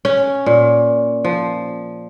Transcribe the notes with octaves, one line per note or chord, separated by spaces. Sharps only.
C#4
A#2
F3